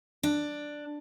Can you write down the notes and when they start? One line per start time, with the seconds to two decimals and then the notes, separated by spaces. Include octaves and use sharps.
0.23 D4